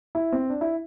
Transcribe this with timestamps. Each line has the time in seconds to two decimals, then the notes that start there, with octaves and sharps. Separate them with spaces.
0.15 E4
0.32 C4
0.50 D4
0.61 E4